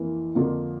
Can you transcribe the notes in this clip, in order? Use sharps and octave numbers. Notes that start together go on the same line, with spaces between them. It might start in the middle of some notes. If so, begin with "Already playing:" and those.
Already playing: F2 E3 A#3
F2 D3 F3 A#3 F4